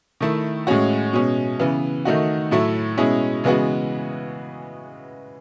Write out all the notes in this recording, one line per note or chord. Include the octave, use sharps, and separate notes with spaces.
D#3 A3 E4
A2 G#3 C#4 F#4
B2 G#3 C#4
C#3 E3 B3
D#3 A3 D#4 F#4
A2 F#3 A3 E4
B2 G#3 C#4 E4
C#3 E3 G#3 B3 F#4